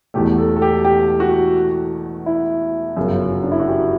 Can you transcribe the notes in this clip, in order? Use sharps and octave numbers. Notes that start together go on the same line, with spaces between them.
E1 E2 B2 A3 G4
A4
A4
G4
G4
F#4
E4
G1 F#2 C#3 F#4
D4
E4
F#4
G4